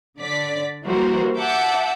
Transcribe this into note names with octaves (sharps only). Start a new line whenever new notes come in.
D3 D5 B6
E3 G3 A#3 F#4 A#4 C5
E5 F#5 A5 D6 E6 G6